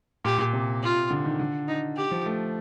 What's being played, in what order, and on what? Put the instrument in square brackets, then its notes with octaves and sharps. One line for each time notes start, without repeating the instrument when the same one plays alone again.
[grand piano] A#2 [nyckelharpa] G4
[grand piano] A#2
C3
[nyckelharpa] F4
[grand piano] D3
D#3
D3
[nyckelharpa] D#4
G4
[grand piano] F3
A3